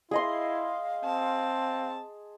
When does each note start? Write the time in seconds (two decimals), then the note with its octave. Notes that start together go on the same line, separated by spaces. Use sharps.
0.11 E4 G#4 D#5 F5 C6
1.05 C4 A5